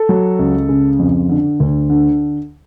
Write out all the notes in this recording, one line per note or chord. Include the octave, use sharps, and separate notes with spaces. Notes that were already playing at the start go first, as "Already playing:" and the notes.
Already playing: A4
F#3
C#2
C#3
F2
D3
D2
D3